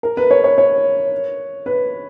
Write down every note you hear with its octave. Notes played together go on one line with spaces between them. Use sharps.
A#4
B4
C#5
C#5
C#5
B4